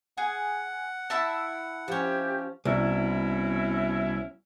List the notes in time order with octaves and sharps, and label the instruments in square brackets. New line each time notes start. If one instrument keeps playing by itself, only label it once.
[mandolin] G#4 [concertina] F#5
[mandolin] E4 E5 A5
[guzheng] F3 C#4 [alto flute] G4
[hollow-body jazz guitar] C2 [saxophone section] B2 C#4 E4